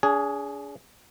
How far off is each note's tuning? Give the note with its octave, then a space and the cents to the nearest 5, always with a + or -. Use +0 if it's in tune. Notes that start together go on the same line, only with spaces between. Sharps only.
D4 -40 G#4 +0